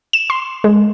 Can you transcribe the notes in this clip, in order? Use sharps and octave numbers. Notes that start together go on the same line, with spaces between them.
E7
C6
G#3